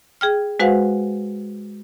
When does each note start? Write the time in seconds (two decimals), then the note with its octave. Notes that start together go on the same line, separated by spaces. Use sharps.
0.21 G#4 G5 F6
0.60 G#3 F#4 B4 C5 F5 F#5